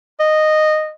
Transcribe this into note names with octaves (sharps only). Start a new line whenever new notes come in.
D#5